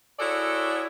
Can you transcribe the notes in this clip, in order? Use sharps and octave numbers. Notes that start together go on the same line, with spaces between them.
E4 F#4 G#4 A4 C#5 D5